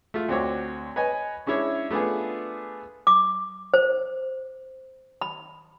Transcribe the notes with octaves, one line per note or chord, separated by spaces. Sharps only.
A3 F4
D2 C4 F#4 C#5 D6
B4 C#5 D#5 G#5
G#3 C#4 D4 E4 C#5
A3 B3 D4 F4 G#4
D6
C5
B5